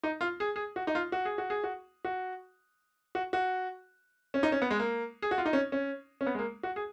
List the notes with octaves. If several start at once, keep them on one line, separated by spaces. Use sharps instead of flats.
D#4
F4
G#4
G#4
F#4
D#4
F4
F#4
G#4
F#4
G#4
F#4
F#4
F#4
F#4
C#4
D#4
C#4
B3
G#3
A#3
G#4
F#4
F4
D#4
C#4
C#4
C#4
B3
G#3
A#3
F#4
G#4